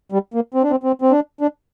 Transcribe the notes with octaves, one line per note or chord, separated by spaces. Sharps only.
G3
A#3
C4
D4
C4
C4
C4
D4
D4